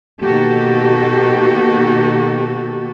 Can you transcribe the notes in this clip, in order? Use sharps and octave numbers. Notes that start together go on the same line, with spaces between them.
B2 D#3 A#3 F#4 G4 A4